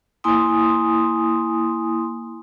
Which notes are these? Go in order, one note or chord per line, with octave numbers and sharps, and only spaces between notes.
A#3 E4 G#5 C6 D#6